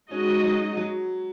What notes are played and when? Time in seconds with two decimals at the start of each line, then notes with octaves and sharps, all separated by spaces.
0.10 G#3 C#4 D#4 F#4 D#5
0.44 F#3
0.77 F#3